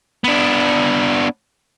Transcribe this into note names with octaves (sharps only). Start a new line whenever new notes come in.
B3 D4